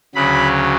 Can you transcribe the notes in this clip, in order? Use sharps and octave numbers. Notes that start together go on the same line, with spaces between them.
D2 C#3 F#3 B5